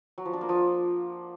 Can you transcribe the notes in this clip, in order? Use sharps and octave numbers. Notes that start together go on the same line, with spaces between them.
F#3
F3
D4
A#3
F3